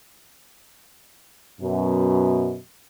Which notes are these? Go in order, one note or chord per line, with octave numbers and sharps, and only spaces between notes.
F#2 B2